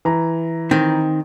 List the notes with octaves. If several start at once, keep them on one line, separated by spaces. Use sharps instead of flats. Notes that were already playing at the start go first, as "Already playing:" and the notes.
E3 A#5
D#3 C4